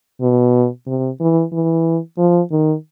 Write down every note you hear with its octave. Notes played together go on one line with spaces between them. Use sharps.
B2
C3
E3
E3
F3
D#3